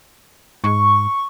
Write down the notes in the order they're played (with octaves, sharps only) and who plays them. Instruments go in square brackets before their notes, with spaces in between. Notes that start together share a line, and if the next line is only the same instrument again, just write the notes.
[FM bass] G#2 [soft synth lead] C#6